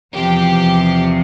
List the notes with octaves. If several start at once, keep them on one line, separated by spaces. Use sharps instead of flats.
E2 C3 F3 G4